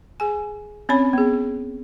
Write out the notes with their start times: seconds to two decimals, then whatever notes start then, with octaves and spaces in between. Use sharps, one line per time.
0.20 G#4 G#5
0.89 C4 C#4 C#5 B5
1.13 B3 G#4